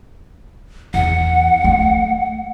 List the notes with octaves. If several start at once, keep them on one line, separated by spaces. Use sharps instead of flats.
E2 F#5
A3